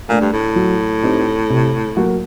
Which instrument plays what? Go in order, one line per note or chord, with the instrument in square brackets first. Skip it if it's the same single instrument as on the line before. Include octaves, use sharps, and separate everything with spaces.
[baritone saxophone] A#2 [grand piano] A3 D4
[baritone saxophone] G2
A2
[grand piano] F#3
C4 D#4 G4
C3
F#3 A#3 F#4